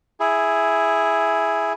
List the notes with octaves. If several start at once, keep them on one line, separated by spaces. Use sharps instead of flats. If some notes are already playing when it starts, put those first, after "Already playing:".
E4 G#4